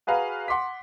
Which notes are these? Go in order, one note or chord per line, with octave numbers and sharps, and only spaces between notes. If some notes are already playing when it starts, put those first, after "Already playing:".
F#4 G#4 B4 F5 A#5
F#5 C6 D6 B6